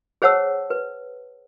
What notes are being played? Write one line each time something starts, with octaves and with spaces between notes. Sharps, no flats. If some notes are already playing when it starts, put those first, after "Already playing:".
G#4 C5 C#5 F#5 A5 E6
B4